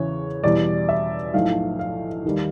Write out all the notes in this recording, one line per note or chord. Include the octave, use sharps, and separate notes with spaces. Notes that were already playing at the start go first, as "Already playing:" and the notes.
Already playing: E2 C#3 E3 C#5
E2 B2 G3 D5
E5
B1 A2 F3 F5
F5
D#2 D#3 G3